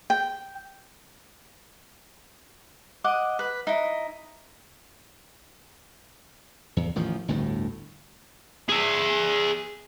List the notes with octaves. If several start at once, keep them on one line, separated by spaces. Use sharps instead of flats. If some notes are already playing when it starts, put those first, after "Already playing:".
G5
D#5 F#5 D6
B4
D#4 E4
E2
A1 D#3 F3
G1 D2 A2
G#4 E5